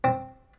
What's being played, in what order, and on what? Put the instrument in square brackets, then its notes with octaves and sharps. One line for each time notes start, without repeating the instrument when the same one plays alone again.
[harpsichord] C4